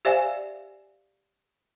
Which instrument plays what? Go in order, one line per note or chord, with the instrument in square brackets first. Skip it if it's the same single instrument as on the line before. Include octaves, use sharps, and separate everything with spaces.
[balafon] G4 C5 D5 E5 F5 G#5